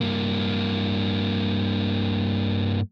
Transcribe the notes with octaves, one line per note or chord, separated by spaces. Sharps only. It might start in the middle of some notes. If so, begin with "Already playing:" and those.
G2 A#3